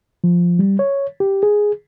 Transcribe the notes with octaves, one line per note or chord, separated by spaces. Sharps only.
F3
G3
C#5
G4
G#4